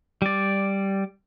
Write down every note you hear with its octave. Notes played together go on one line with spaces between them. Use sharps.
G3 D5